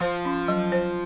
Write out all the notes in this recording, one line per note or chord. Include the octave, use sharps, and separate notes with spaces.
F3 F4 C5
C#4
F#3
C5